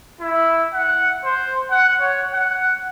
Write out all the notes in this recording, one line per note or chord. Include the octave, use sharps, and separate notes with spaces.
E4
F#5
C5
F#5
C#5
F#5